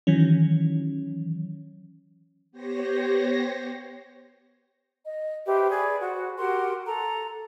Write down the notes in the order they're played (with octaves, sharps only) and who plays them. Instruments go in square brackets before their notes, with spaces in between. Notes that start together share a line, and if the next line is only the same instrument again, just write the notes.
[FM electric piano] D#3 E3 F#3 C#4
[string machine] B3 G4 C5 C#5 A#6
[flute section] D#5
G4 B4 C5 E5
G#4 B4 D5
F#4 C5
F#4 G4 A#4 C6
A4 A#5